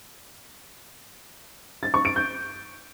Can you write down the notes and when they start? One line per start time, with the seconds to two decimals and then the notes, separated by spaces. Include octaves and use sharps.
1.83 A6
1.94 C#6
2.05 D7
2.16 G6